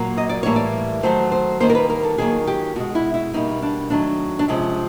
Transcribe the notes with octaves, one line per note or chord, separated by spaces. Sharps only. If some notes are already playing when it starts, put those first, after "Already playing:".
Already playing: A#2 F#3 A#3
D#5
D5
A2 E3 G3 A#3 C#5
D5
D#3 F#3 A3 C5
C5
D#3 G3 A#3 C5
A#4
B4
A#4
A4
D#3 F#3 A#3 G#4
G4
B2 G#3 F#4
E4
E4
B2 G3 A#3 D#4
D4
D#3 F#3 A3 D4
D4
C3 F3 G#3 C#4